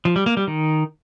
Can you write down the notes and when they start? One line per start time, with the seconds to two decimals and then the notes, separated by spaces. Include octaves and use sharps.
0.05 F3
0.16 G3
0.26 A#3
0.37 G3
0.47 D#3